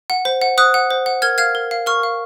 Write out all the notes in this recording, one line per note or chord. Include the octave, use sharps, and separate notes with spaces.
F#5
C5
F#5
C5 D#6 F#6
F#5
C5
F#5
A#4 F6 G#6
F5 F6 G#6
A#4
F5
A#4 C#6 F6
F5